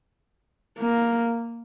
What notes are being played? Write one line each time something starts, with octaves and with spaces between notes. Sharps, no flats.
A#3